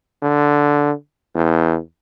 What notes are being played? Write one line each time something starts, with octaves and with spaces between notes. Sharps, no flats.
D3
E2